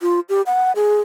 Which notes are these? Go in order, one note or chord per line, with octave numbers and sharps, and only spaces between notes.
F4
G4
F#5
G#4